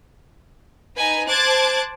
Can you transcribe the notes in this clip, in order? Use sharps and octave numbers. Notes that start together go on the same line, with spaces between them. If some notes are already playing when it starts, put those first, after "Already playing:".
D#4 B4 G#5
C5 A5 D6 F#6 G#6 A6